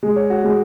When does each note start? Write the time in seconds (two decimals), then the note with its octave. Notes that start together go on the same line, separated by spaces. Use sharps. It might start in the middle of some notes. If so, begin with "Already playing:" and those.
0.03 G#3
0.16 C#5
0.30 F#4
0.44 G#3